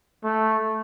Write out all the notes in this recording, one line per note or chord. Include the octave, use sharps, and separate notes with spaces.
A3